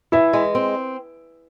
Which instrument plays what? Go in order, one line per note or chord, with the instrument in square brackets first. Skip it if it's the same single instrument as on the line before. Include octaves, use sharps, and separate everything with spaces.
[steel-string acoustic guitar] E3 [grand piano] E4 E5
[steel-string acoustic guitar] G#3
C4